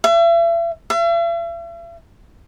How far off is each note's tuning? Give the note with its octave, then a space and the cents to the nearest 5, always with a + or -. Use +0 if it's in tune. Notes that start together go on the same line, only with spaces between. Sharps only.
E5 +40
E5 +45